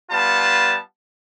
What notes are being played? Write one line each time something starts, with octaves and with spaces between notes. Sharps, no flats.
G3 B3 F4 A5